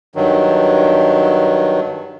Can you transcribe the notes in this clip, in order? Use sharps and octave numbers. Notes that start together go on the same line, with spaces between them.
G2 D#3 F#3